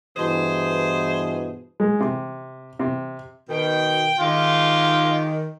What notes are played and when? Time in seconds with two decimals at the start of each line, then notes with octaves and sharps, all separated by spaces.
0.17 G2 B2 E3 G#4 C5
1.80 G#3
2.00 C3
2.79 C3
3.49 B2 D#3 G5
4.19 D#3 G#3 F4 G4